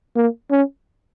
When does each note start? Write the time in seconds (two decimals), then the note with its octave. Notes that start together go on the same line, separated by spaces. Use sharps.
0.16 A#3
0.51 C#4